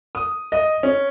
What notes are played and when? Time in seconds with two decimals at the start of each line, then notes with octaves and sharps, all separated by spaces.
0.15 D#6
0.52 D#5
0.83 C#4